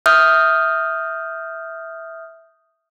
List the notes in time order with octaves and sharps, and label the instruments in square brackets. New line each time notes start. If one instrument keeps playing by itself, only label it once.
[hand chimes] E5 D#6 F6 G6